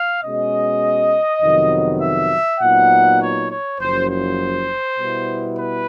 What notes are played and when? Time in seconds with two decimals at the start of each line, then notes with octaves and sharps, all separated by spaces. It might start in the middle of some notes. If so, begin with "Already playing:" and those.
Already playing: F5
0.24 B2 G#3 C#4 D#5
1.42 F2 C3 D#3 F#3 B3
2.01 E5
2.60 A#2 F#3 B3 D#4 F#5
3.20 C#5
3.50 C#5
3.79 F#1 F#2 C#3 F3 C5
4.09 C5
4.98 B2 G3 B3 E4
5.58 B4